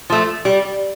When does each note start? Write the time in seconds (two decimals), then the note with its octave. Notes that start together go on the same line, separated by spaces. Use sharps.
0.10 F3 A3
0.45 G3